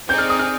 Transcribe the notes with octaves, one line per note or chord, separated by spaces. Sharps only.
C4 D#4 G#4 D5 G6
F6
D#6
F6